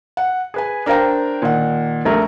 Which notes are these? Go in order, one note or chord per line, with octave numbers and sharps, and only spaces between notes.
F#5
G#4 B4 G#5
D4 A#4 C5 F5 G5 A#5
A#2 D#3 F#5
A#1 A3 A#4